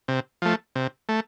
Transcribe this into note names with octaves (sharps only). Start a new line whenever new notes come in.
C3
F3 A3
C3
A3